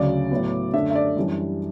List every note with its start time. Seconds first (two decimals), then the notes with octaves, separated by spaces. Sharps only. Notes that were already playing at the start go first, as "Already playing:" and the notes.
Already playing: D2 C#3 F#3 D5
0.31 A2 F#3 B3
0.73 F#2 D3 A3 D4 E5
0.90 E5
0.95 D5
1.16 F#2 E3 G3 D4